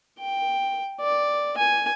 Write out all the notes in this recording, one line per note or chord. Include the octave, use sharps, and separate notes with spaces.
G5
D5
G#5